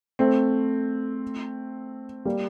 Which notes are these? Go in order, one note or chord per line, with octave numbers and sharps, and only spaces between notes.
A3 C4
G3 A#3